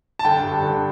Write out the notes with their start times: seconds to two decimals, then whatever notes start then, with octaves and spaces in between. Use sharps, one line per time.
0.19 A5
0.25 D3 G5
0.43 G2
0.63 D3